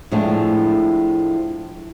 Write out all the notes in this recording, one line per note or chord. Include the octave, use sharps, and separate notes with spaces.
A2 F3 G#3 A3 D4